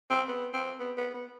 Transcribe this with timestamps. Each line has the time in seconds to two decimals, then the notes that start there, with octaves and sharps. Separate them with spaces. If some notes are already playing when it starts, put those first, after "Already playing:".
0.10 C4
0.28 B3
0.54 C4
0.80 B3
0.97 B3
1.14 B3